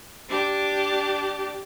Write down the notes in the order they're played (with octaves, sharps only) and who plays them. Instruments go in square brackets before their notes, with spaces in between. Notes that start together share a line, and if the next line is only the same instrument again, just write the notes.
[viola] D4 G4